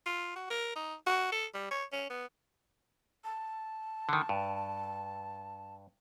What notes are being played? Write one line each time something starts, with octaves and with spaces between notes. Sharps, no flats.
F4
F#4
A#4
D#4
F#4
A4
G3
C#5
C#4
B3
A5
D3 D#3
G2